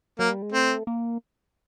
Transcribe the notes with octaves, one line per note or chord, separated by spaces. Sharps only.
F#3 A#3
G3
G#3
A3 C4
A#3